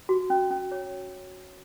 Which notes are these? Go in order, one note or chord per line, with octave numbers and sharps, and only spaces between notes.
F#4
C#4
C#4
C#5